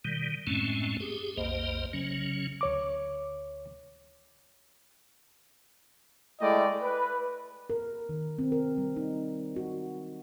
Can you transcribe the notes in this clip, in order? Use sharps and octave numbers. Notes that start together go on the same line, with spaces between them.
B2 D#3 G3
F#2 A2 G#3 A3 C4 C#4
G4 G#4
B1 F2 A#3 C5 D#5
C#3 F#3 C#4
D2 C#5 D6
G#3 A3 E4 D5 D#5 G5
B4
A#4
D#3
C4
A#4
G3
D#4
F#4